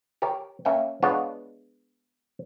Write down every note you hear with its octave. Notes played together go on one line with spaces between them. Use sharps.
G4 A#4 C#5
A#3 C#4 E5 G5
G#3 B3 D4 F4 C#5